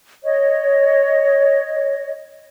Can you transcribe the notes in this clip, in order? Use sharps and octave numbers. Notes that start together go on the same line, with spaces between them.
C#5 D#5